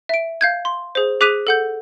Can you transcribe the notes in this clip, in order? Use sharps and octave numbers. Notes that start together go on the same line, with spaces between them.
E5 D7
F5 G6 G#6
C6
G#4 C5
G#4 D6 F#6 B6 D#7 F7
A4 F#5 G6